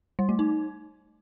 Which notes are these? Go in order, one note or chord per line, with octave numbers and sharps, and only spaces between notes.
G3
A3
D#4